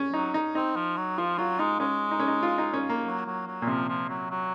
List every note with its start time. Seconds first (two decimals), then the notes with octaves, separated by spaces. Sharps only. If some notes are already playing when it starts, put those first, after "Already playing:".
Already playing: C#4
0.13 F#3 D#4
0.34 D#4
0.55 C4 D#4
0.76 F3
0.97 F#3
1.18 F3 F4
1.38 F#3 F4
1.59 G#3 D#4
1.79 G#3 C#4
2.11 D#4
2.20 C#4
2.28 D#4
2.43 F4
2.58 D#4
2.74 C#4
2.89 A#3
3.05 F#3
3.26 F#3
3.47 F#3
3.62 A#2
3.67 C3 F3
3.89 F3
4.09 F#3
4.30 F#3